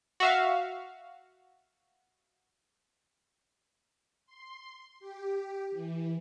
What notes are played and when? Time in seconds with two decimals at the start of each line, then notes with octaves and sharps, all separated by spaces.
0.20 F#4 E5 F5
4.26 C6
5.00 G4
5.72 E3